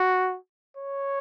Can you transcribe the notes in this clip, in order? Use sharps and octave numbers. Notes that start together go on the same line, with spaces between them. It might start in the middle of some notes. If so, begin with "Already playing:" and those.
Already playing: F#4
C#5